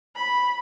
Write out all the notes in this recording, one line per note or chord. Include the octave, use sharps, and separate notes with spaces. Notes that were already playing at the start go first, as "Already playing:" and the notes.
B5